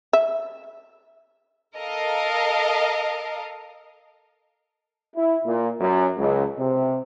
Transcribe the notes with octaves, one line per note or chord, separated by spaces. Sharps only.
E5
A4 A#4 D#5 F5
E4
A#2
F#2
C#2
C3